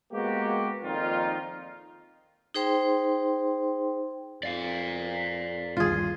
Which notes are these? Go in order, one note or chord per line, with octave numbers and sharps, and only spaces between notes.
G#3 A#3 B3 F#4 G4
F2 A#2 D#3 D#4 F4
D#4 G#4 C5 G5 C6
F2 D5 F5
G1 D#2 F4 G#4